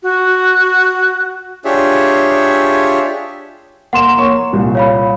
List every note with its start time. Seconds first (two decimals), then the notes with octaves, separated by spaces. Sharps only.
0.03 F#4
1.65 D4 F4 G4 G#4 C#5 E5
3.93 A#3 F#5 C6 E7
4.17 A#3 C#5 C#6
4.53 C2 A#2
4.75 C#5 F5 B5